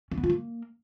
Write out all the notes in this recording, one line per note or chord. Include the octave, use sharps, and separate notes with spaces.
C#4
B3
F4
A#3